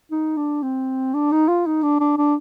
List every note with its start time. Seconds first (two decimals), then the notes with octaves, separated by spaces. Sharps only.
0.11 D#4
0.37 D4
0.63 C4
1.14 D4
1.32 D#4
1.48 F4
1.66 D#4
1.83 D4
2.00 D4
2.17 D4